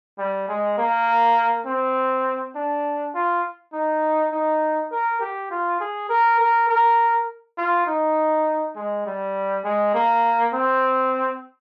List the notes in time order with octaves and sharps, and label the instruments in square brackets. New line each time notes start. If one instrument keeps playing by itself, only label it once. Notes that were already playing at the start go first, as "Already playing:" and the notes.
[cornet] G3
G#3
A#3
C4
D4
F4
D#4
D#4
A#4
G4
F4
G#4
A#4
A#4
A#4
F4
D#4
G#3
G3
G#3
A#3
C4